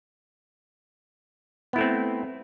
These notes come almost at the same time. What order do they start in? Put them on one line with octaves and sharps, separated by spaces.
B3 E4 A3 C4